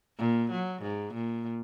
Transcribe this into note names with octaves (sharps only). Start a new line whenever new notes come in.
A#2
F#3
G#2
A#2